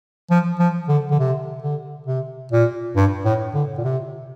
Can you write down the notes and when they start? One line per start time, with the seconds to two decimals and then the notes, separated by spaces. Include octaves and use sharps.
0.30 F3
0.59 F3
0.89 D3
1.11 D3
1.19 C3
1.63 D3
2.06 C3
2.52 A#2
2.96 G2
3.25 A2
3.54 D3
3.78 A#2
3.84 C3